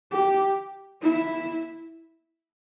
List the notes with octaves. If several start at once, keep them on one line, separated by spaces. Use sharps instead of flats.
G4
E4